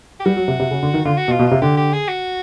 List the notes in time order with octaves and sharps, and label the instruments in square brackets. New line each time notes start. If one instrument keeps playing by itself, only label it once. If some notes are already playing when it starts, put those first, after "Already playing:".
[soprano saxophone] G4
[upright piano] G3 [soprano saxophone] F#4
[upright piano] F#3
C3
C3
C#3
D3
D#3
[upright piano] D3 [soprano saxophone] F4
[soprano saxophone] F#4
[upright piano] B2
[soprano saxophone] F4
[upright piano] B2
[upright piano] C3 [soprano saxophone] F4
[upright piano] D3 [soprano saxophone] G4
[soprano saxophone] G4
G#4
F#4